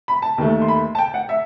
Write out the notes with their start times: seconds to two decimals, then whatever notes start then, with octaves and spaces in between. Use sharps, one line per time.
0.08 B5
0.22 A5
0.38 D#2 D#3 A3
0.62 C6
0.68 B5
0.95 A5
0.98 G5
1.14 F#5
1.29 E5